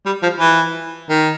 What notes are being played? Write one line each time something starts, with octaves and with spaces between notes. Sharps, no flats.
G3
F3
E3
D#3